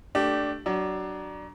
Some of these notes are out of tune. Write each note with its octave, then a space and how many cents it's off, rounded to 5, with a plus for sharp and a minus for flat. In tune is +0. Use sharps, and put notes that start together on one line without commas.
A3 +0 D4 +0 G4 -20
F#3 +30 D4 +10